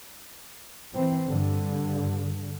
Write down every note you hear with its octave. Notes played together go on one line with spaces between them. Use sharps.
E3 C4
G2 D3